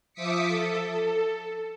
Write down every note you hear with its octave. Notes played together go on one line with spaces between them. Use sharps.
F3 E5 D6 D#6 B6 C#7
A4